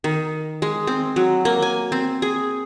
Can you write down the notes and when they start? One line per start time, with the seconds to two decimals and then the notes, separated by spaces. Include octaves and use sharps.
0.04 D#3
0.62 G#3
0.87 C4
1.16 F#3
1.45 A#3
1.62 G#5
1.92 C4
2.22 G#4